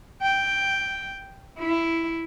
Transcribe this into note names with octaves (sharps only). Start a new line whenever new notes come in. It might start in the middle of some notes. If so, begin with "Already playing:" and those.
G5
E4